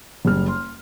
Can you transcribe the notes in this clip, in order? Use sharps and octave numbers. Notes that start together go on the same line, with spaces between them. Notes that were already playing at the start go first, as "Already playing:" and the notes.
F#1 G3 F6
C6